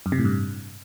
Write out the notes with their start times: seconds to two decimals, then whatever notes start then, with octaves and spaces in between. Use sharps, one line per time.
0.06 F#2
0.12 C3
0.18 A2
0.25 G2